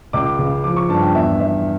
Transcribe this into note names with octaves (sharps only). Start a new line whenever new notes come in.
C#2 D6
C#3
F3 D6
C#6
G2 A5
G5
E2 E5
E2 E5